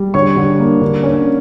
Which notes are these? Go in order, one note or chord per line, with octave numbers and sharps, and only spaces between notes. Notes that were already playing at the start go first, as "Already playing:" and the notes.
Already playing: G3
D3 C#5 C#6
D3
A#3
D3
C#4